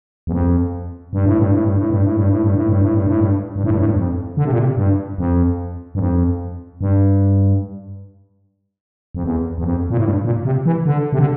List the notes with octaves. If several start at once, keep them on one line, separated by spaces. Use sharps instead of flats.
E2
F2
G2
A2
G2
A2
G2
A2
G2
A2
G2
A2
G2
A2
G2
A2
G2
A2
G2
G2
A2
G2
A2
G2
F2
D3
C3
A#2
C3
G2
F2
G2
F2
G2
F2
E2
E2
F2
A#2
A2
G2
A#2
C3
E3
D3
C3
D3